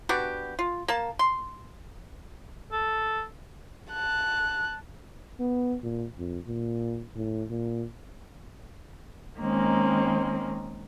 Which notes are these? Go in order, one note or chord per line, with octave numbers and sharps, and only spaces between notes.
B3 D4 F#4 G4
F4
A#3 A5
C6
A4
A5 F#6
B3
A#2
F2
A#2
A2
A#2
D#3 G#3 A#3 C4 C#4